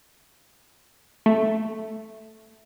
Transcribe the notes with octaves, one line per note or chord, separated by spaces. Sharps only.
A3